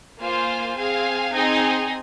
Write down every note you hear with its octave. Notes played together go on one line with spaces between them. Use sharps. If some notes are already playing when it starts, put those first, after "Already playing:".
A#3 F4 C5 F5 G#5
C4 G#4 F5 G#5
C4 D#4 G#4 D#5 G#5